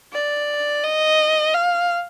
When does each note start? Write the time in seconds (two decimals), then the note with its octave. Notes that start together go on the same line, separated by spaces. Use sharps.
0.13 D5
0.84 D#5
1.55 F5